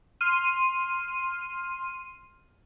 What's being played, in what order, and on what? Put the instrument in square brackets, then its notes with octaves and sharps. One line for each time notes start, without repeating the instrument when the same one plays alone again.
[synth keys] C6 F6 D#7